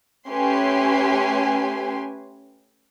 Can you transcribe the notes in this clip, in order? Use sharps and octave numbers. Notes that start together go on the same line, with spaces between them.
A3 C#4 G4 B4 G#5 C6